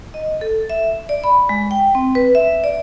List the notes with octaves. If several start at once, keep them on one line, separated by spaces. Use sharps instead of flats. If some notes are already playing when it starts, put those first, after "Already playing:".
D#5
A4
E5
D5
B5
G#3
G5
C4
B4
E5
D5